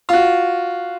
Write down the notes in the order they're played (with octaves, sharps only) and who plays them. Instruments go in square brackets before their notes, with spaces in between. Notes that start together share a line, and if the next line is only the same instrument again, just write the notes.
[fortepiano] F4 F#4